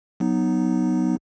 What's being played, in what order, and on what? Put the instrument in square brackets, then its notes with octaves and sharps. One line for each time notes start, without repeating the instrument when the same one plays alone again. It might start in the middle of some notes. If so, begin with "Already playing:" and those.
[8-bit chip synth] F#3 B3 D#4